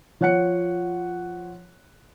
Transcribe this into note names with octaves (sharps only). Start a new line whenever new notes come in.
F3 C#5 F#5 F#6 C#7